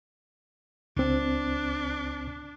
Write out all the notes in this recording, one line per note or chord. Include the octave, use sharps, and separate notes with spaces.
C#2 C4 D4